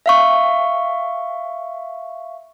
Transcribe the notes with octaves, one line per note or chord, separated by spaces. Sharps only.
E5 F5 C#6